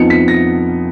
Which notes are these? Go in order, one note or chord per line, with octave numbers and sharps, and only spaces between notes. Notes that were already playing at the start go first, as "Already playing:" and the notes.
Already playing: F2 F3 B3 D#4 C#7
B6
A#6